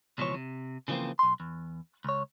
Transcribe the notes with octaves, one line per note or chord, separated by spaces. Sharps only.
C#2 B2 E3 F3 C#5
C3
C#3 E3 F3 G#3 A#3 C4
B1 C6
E2
C#2 C#5